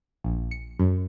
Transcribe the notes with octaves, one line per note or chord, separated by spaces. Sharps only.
A#1
C#7
F#2